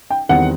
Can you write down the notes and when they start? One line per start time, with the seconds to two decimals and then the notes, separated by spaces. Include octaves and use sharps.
0.10 G5
0.29 E2 D#3 G3 C4 F#5